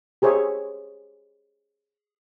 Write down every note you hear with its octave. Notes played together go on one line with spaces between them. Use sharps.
G4 G#4 C5 C#5 E5